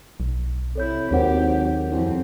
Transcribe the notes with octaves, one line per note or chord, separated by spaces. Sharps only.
B1
C3 E4 A4 C#5 G6
G#1 D#2 F#3 G4 C5 C#5 F#5
C2 F2 C4